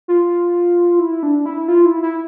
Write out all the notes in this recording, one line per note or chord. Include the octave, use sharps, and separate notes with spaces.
F4
E4
D4
E4
F4
E4
E4